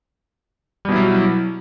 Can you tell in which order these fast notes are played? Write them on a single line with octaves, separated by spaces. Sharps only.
G3 B2 E4 F#3